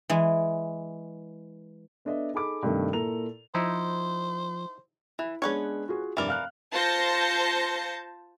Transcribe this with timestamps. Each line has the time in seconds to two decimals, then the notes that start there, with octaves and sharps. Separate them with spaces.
0.09 E3 G#3
2.05 B3 D4 A4 D#5 E5
2.33 D#4 G#4 A4 B5 D6
2.63 G2 C3 D#3 A3
2.93 A#2 E4 A4 A#4 A#5 F7
3.55 F3 D#4 E4 C5
5.19 E3 E4
5.42 G#3 B3 C#4 D4 B4 C#5
5.88 F4 F#4 G#4
6.17 F1 G2 E3 A#4 D5
6.28 F5 F6 F#6
6.74 F4 C5 A5 G6 A#6 C#7